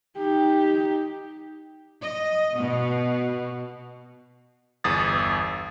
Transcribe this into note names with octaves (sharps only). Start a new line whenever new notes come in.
D#4 G4
D#5
B2
G1 E2 D#6 A6